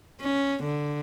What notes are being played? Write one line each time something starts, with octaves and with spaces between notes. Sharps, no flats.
C#4
D3